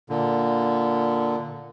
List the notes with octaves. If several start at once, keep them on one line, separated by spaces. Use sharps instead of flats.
A#2 D3